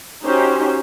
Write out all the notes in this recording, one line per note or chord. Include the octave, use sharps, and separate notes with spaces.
C#4 D#4 F#4 G4 C5